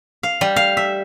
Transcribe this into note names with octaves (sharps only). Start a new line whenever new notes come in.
F5
G3
F5
E5